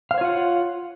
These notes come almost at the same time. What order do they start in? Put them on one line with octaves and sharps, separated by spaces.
F5 C5 C#5 F4 F#5